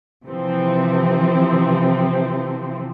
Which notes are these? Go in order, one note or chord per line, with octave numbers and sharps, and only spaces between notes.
C3 E3 F3 C4